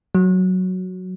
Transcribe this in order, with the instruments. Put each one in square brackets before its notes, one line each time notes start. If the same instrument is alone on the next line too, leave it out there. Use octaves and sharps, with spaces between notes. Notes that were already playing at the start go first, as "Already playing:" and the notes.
[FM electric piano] F#3